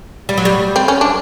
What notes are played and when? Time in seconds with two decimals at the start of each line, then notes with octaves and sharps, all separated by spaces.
0.29 G3
0.38 F#3
0.45 G3
0.76 C4
0.88 C#4
1.01 D4